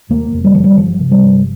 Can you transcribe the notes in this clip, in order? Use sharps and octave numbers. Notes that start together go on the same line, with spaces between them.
D#2 A#3
F1
G3
F1 F3
G3
G1 F3
C3
G3
G1